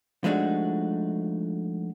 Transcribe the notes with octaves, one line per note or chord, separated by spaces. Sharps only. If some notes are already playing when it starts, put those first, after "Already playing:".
F3 G#3 A3 D4 D#4 F#4